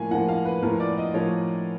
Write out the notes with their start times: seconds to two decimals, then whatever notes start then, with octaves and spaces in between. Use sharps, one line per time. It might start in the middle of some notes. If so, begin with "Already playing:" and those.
Already playing: A2 F3 A#3 G#5
0.11 A2 F3 A#3 F#5
0.29 F5
0.45 B4
0.62 A2 F3 A#3 A#4
0.80 D5
0.98 D#5
1.14 A2 F3 A#3 C#5